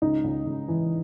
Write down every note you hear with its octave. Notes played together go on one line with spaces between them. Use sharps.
C#2 D#4
C#2
C#2
E3